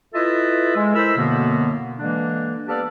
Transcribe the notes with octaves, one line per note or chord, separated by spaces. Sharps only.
E4 F4 A4 B4 D#5 E5
G#3
E4 A4 A#4 C5 B5 E6
F#2 B2 D3 A#3 B3 F#4
D3 E3 G#3 A#3 D4
B3 G4 A4 D5 F5 A5